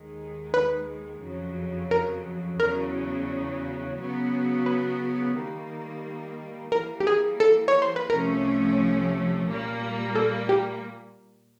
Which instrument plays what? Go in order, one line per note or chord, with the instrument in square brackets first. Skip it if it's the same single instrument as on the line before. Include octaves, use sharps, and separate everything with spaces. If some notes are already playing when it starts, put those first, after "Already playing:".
Already playing: [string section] D#2 D#3 G#3
[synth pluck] B4
[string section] F2 C#3 F#3
[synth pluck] A#4
[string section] E2 C#3 F#3 [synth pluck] A#4
[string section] C#3 F#3 B3
[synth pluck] B4
[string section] D#3 G3 A#3
[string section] E3 G3 A#3 [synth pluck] A#4
[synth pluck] G4
G#4
A4
C#5
C5
B4
[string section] C2 C3 F3 A3 C#4 [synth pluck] A#4
[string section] A#2 G3 A#3
[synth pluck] A4
G4